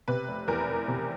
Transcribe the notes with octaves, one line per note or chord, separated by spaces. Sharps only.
C3 B4
F1
E2 A#4
F1
C3